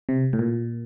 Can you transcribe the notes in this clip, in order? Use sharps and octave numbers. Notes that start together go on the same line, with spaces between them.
C3
A2
A#2